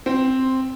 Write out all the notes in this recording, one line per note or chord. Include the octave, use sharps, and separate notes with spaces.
C4